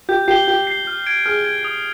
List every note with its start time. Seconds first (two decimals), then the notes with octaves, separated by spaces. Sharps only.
0.09 G4 G6
0.28 G4 C7 G7
0.47 G4 G6
0.67 C7 G7
0.87 F6
1.06 G#6 D7
1.26 G#4 F6
1.45 G#6 D7
1.65 D#6